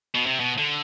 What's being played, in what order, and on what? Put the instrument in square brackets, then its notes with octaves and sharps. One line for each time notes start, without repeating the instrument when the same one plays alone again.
[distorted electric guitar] B2
C3
B2
D3